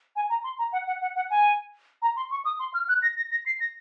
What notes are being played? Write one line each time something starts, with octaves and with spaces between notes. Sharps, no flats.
G#5
A#5
C6
A#5
F#5
F#5
F#5
F#5
G#5
A#5
C6
C#6
D#6
C6
F6
F#6
A#6
A#6
A#6
C7
A#6